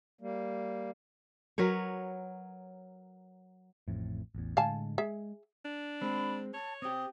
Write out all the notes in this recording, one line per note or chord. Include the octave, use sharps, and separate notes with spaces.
G3 A#3
F#3 A#4 B4 C#5
A1 F2 A2
A1 E2
A2 D3 G#3 F5 G#5 A5
G#3 G#4 E5
D4
G#3 C4 B5
C#5 A5
C4 G4 D#6